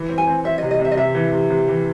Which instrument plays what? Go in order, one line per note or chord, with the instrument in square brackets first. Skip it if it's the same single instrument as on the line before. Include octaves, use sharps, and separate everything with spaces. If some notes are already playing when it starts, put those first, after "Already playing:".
Already playing: [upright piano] E3
C4
[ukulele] G#5
[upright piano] C4
[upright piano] C4 [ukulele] E5
[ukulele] D#5
[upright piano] C3
[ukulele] D#5
[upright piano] C3
[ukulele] E5
D#5
[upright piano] C3 [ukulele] E5
[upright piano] E3
C3
C3
E3